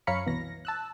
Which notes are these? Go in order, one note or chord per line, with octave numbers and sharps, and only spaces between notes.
F#2 C#5 F5 A#5 B5 C#7
C2 B2 E3 A#6
A5 E6 F#6